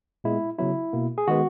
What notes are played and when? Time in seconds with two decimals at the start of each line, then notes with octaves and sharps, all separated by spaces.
0.24 A#2 G#3 B3 E4
0.58 C#3 F#3 B3 E4
0.93 B2 A#3
1.18 G#4
1.28 D#3 G#3 B3 F#4